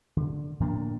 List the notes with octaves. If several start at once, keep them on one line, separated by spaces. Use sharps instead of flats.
D3
A2 F3 A#3 D4